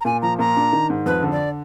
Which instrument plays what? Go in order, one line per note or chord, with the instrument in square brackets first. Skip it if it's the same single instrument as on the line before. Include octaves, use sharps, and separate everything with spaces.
[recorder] A#5
[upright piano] A#2 [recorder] G#5
[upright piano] F3 [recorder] A#5
[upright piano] A#2 [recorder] A#5
[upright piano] D4
D#3
G#2
[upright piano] F2 [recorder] B4
[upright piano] D3
[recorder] D5